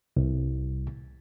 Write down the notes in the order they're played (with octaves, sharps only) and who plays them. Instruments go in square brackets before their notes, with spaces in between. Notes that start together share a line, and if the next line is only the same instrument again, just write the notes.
[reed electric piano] C2